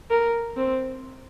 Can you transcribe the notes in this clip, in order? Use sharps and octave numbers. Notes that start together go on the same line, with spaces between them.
A#4
C4